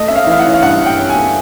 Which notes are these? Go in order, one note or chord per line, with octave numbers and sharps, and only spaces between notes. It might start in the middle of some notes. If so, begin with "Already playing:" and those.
Already playing: A3 D#5
C#4 E5
F5
E3 F5
F#5
C#4
F5
G2 F#5
G2
G5
C#4
G#5
A3